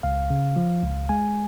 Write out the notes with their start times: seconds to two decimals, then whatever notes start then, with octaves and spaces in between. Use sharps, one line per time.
0.03 C#2 F5
0.30 C#3
0.56 F3
0.83 C#2
1.09 G#3 G#5